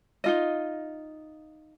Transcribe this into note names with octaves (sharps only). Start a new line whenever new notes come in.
D#4 F4 D#5